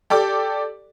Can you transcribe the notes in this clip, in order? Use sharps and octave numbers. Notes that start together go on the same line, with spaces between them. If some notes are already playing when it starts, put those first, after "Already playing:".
G4 A4 D5 D6